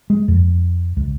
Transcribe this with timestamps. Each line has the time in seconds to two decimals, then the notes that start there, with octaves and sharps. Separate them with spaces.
0.10 G#3
0.28 F2
0.97 C#2